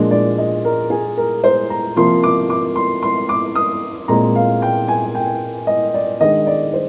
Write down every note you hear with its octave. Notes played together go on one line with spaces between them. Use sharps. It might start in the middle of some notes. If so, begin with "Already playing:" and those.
Already playing: A#2 F3 G#3 D4
D5
D#5
A#4
G#4
A#4
C5
A#5
C3 F3 A#3 C6
D6
D6
C6
C6
D6
D#6
A#2 G#3 C4 A#5
F5
G5
G#5
G5
D#5
D5
D#3 G#3 D4 D#5
D5
C5